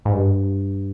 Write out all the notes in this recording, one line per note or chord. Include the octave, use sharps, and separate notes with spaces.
G#2
G2